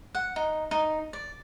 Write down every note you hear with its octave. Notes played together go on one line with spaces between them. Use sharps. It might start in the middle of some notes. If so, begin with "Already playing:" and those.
F#5
D#4
D#4
D5